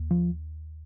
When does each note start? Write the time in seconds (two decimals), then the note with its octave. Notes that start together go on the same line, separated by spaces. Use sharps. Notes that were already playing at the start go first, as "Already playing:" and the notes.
Already playing: D#2
0.11 F3